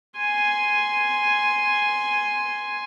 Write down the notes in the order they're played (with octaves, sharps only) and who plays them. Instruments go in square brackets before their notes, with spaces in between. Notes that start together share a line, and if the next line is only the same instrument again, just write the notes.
[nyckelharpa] G#5 C6